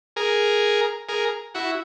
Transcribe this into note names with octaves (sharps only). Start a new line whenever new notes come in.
G#4 A#4
G#4 A#4
E4 F#4